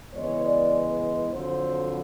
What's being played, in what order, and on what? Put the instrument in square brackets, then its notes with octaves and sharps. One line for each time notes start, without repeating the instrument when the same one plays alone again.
[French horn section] C#3 E3 G#3 B3 C#5
D5
F2 D3 F#3 C5